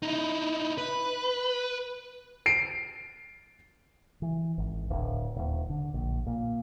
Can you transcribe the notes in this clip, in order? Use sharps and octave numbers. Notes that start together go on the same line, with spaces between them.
D#4 E4
B4
C7 D7
E3
G#1
D1
D#1
D3
A#1
A#2